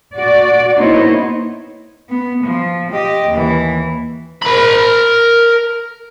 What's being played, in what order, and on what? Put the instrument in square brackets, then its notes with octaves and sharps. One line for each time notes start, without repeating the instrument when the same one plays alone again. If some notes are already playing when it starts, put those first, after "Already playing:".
[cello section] F#4 D5
A#3 B3 D#4 E4 C5 C#5
[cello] B3
F3
G4 D#5
D#2 E3
[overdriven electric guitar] A#4 B5